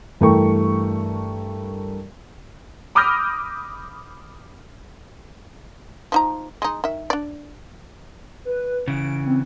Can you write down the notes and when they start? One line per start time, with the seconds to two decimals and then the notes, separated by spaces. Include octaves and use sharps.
0.21 G2 E3 A3 A#4 G5 C#6
2.95 B5 D6 D#6 F6 G6 A#6
6.12 F3 D#4 A#5
6.62 G#3 D#4
6.84 D#3 E5
7.10 D4 D5
8.45 B4
8.88 C#3 E3 D7
9.26 C4